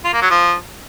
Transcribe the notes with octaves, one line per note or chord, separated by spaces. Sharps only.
F4
A#3
F#3
F3